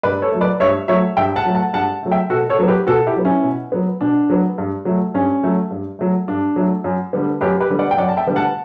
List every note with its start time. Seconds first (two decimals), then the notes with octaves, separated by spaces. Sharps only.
0.03 G2 B4 D5
0.22 A4 C#5
0.32 F#3 A3
0.41 B4 D5
0.60 G2 C#5 E5
0.88 F#3 A3 C#5 E5
1.17 G2 E5 G5
1.36 F#5 A5
1.45 F#3 A3
1.55 F#5 A5
1.73 G2 F#5 A5
2.03 F#3 A3
2.11 E5 G5
2.30 B2 F#4 A4
2.49 A4 C#5
2.59 F#3 B3
2.68 G4 B4
2.87 B2 F#4 A4
3.07 E4 G4
3.16 F#3 B3
3.25 C#4 E4
3.44 B2
3.72 F#3 B3
4.01 B2 D4
4.30 F#3 B3
4.58 G2
4.85 F#3 A3
5.14 G2 C#4
5.43 F#3 A3
5.71 G2
5.99 F#3 A3
6.28 G2 D4
6.56 F#3 A3
6.84 F#2
7.13 D3 G3 B3
7.41 F#2 G4 B4
7.60 G4 B4
7.70 D3 G3 B3
7.79 D5 F#5
7.91 G5
7.97 F#2 D5 F#5
8.09 A5
8.17 E5 G5
8.26 D3 G3 B3
8.36 F#5 A5